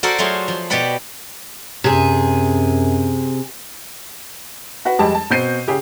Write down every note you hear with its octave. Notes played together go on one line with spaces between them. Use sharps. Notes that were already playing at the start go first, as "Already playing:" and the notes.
F#4 A4 A#4 C5 D5 F#5
F#3 A3 F4 F#4 G#4 C5
F3
B2 G4 B4 D5 F#5 B5
F#2 C3 G#4
F#4 B4 F#5
F2 G3 G#3 G4 A5
A5
B2 C4 G6 C7 D#7
C#3 G4 G#4